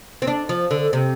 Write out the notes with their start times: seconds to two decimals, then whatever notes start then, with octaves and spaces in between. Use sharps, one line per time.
0.22 C4
0.27 D4
0.49 F3
0.71 D3
0.93 C3